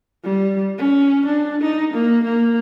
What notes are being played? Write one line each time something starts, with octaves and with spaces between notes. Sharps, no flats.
G3
C#4
D4
D#4
A#3
A#3